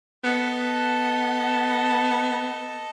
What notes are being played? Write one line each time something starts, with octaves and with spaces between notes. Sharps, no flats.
B3 A4 D#5